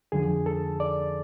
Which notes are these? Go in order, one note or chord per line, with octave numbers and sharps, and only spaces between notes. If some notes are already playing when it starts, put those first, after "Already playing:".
F2 D3 F3 G#4
A4
D5